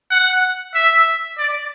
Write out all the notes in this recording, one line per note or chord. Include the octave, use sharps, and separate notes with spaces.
F#5
E5
D5